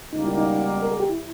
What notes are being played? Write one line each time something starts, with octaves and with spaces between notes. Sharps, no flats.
C#2 B2 G3 A#3 D#4
E4
D#4
A#4
G#4
G4
E4